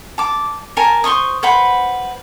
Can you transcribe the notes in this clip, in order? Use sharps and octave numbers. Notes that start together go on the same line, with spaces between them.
A5 D6
A#4 G#5 A5
C5 C6 C#6 D#6
B4 C5 F#5 B5